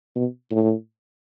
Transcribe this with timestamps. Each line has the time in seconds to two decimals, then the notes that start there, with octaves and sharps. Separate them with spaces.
0.15 B2
0.51 A2